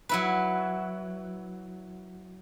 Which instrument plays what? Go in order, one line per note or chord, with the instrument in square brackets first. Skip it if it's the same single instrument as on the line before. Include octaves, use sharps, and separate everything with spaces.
[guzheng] F#3 E4 B4